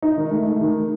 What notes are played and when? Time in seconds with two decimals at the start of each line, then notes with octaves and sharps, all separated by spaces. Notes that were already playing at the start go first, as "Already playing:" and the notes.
0.02 D#4
0.17 D#3
0.31 A3
0.46 A3
0.61 D#3